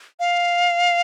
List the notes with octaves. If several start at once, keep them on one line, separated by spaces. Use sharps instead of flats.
F5